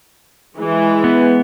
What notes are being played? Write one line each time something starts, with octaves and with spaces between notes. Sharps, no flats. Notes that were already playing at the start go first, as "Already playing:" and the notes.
E3 G#3
B3